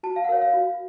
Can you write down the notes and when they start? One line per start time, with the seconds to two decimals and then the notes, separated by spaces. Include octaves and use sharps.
0.03 F#4 A5
0.16 F5
0.24 F#5
0.29 A#4 C#5 F5
0.42 F5
0.54 F#4